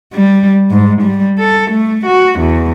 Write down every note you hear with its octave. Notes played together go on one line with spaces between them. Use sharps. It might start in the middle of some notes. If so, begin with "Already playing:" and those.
G3
G#2
G3
A4
A3
F#4
E2